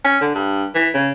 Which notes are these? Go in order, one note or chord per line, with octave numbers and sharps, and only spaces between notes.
C#4
D3
G2
E3
C#3